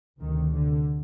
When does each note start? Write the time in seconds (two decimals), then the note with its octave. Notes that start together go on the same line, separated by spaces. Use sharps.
0.18 D2 C3 D#3
0.53 D3